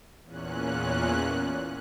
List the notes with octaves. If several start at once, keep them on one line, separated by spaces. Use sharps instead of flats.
E2 A#2 C#4 F#6